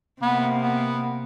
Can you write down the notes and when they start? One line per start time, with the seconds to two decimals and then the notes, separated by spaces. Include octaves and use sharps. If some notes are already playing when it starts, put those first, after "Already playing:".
0.22 C3 A#3 B3
0.63 B3